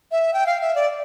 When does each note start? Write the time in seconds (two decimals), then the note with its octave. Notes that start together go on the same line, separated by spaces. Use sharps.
0.12 E5
0.34 G5
0.46 F5
0.61 E5
0.75 D5